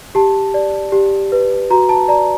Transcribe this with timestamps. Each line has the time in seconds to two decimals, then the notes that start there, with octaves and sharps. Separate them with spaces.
0.15 G4 A5
0.54 D5
0.92 G4
1.32 B4
1.70 F#4 A#5
1.89 A5
2.08 D5 A#5